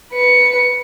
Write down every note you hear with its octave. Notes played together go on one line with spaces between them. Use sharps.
B4 C#7